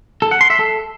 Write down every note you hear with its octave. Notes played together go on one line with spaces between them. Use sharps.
A4
F#5
C6
E5
A4